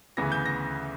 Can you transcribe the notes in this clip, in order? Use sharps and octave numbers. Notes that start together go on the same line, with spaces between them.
D2 C#3 E3 B3 A#6
G6
A#6